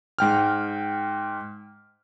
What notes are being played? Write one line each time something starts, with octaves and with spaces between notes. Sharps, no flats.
G#2 G5 F6